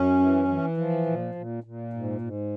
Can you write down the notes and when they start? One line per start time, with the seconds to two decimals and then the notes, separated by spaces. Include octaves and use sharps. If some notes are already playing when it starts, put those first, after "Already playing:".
Already playing: F#2 C#4
0.20 E3
0.48 E3
0.77 F3
1.06 A#2
1.35 A#2
1.64 A#2
1.93 G#2
2.21 G#2